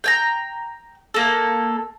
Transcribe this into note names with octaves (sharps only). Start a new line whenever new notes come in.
G5 G#5 A#5
A#3 A4